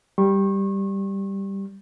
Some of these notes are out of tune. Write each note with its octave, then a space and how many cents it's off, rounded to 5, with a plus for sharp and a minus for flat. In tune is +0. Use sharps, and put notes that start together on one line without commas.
G3 +0 C#6 -35